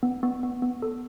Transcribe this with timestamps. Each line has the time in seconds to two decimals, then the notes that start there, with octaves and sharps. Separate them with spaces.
0.03 B3
0.23 B3
0.43 B3
0.62 B3
0.82 A4